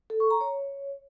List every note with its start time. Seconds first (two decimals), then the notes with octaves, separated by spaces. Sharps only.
0.10 A4
0.20 C#6
0.31 A#5
0.41 C#5